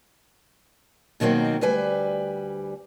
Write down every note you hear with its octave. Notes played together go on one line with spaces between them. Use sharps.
B2 D#3 F#3 A#3 C4
D2 G3 B4 G#5